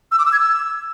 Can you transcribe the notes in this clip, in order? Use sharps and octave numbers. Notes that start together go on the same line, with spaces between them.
E6
D6
E6
G#6
E6